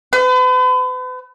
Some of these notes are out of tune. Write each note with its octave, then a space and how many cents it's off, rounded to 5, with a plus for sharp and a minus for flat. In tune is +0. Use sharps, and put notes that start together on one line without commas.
B4 +40